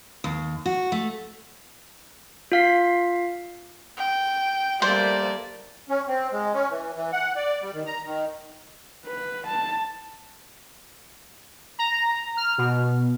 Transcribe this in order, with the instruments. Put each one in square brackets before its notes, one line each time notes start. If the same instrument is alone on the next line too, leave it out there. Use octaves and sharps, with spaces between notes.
[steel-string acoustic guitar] D#2
F#4
A3
[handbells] F4 F5 B6
[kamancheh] G5
[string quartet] G3 A#3 [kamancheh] A3 D5 [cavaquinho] C5
[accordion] C#4
C4
G#3
C#4
E3
E3
F#5
D5
G3
D#3
A#5
D#3
[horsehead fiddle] B4
A5
[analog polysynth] A#5
F6
B2